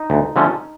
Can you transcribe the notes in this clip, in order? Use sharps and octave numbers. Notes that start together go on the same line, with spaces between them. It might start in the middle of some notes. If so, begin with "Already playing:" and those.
Already playing: D#4
D2
D3 F3 A3 C#4